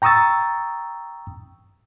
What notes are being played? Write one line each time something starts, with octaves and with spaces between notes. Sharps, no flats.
G5 A#5 C#6 D#6 E6 A6